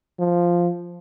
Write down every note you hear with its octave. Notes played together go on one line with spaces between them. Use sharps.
F3